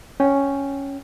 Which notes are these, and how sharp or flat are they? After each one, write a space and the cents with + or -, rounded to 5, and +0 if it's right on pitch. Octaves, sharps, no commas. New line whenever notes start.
C#4 +0 G5 -10